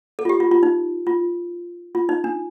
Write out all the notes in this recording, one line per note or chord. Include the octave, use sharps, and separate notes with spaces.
A4
F4
G4
F4
F4
D#4
F4
F4
D#4
D4